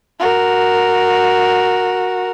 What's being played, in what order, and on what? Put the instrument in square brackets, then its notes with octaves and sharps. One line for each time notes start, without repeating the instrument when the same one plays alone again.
[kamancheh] F#4 A#4